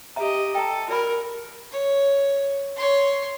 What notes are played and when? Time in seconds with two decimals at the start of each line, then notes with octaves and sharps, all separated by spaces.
0.16 G4 D#5 E5 A#5
0.55 A4 G5 A#5
0.88 F#4 A#4 D5 B5
1.72 C#5
2.76 C#5 C6